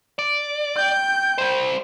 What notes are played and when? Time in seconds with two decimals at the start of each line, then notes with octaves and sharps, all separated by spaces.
0.19 D5
0.77 G5 G6
1.38 G3 C5